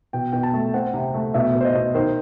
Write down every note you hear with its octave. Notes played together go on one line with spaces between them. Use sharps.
B2 G5
B2 G5
A5
A3
C4 F#5
C3
A3
B2 E5
B2
C5
D#5
B2
D#3 C5